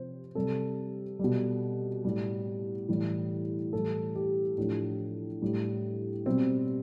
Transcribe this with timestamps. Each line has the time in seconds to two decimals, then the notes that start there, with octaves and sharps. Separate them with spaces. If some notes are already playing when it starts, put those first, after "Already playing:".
Already playing: C3 F3 C5
0.35 C3 G3 A4
1.19 B2 G3
2.04 A2 G3
2.89 A2 E3 G3
3.73 A2 E3 G3 A4
4.15 G4
4.58 A2 F3 D4
5.42 A2 G3
6.26 B2 G3 C4